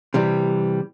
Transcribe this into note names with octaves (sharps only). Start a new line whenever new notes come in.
C3 E3 G3